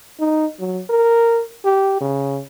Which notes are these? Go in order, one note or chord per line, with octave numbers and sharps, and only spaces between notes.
D#4
F#3
A#4
G4
C#3